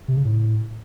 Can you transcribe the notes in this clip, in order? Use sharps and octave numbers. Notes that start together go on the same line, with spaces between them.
C3
C#3
A2